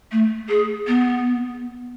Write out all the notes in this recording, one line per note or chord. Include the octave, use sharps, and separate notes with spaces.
A3
G#4
B3